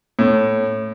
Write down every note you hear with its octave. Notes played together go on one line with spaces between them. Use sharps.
A2